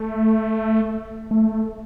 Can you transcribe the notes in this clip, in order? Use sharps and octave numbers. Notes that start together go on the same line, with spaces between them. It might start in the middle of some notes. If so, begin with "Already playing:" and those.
Already playing: A3
A3